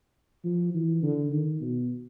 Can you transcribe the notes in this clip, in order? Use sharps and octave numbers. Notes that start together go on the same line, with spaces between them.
F3
E3
D3
D#3
B2